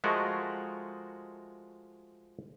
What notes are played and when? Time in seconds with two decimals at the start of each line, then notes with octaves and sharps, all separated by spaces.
0.04 F3 G#3 A3 F#4 A#4 D#5